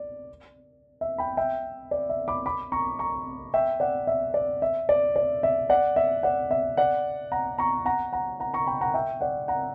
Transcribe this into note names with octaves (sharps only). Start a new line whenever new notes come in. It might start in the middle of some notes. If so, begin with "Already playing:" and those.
Already playing: D5
E5
G5 B5
E5 G5
D5
E5
B5 D6
B5 D6
A#5 C#6
A#5 C#6
E5 G5
D5 F#5
E5
D5
E5
D5
D5
E5
D5 F#5
E5
D5 F#5
E5
D5 F#5
F#5 A#5
A#5 C#6
F#5 A#5
F#5 A#5
F#5 A#5
A#5 C#6
G5 B5
F#5 A#5
E5 G5
D5 F#5
F#5 A#5